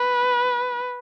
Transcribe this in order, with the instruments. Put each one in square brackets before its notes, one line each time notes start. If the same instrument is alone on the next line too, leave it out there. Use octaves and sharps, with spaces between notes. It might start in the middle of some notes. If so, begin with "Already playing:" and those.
Already playing: [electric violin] B4